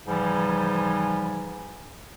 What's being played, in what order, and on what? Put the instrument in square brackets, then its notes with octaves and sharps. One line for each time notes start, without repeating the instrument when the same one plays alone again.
[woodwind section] G#2 C#3 E3 F3 G3